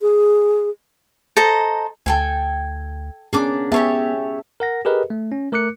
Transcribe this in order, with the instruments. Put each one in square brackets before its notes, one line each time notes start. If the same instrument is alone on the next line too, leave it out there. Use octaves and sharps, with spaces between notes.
[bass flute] G#4
[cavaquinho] A4 C5 D#5 A#5
[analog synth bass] D2 [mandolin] A4 G5 G#5
[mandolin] A#3 D4 D6 [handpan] B3 C#4 G#4
[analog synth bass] B3 [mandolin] G4 C#5 A5 [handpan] G#4 E5
[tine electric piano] A#4 F#5 A#6
G4 G#4 A#4 B4 D#5
A3
C#4
A3 A#4 D6 F#6 C#7